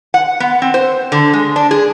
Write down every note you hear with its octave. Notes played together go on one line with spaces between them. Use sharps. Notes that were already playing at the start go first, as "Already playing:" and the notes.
F#5
B3
C4
C5
D3
G#3
D4
G#4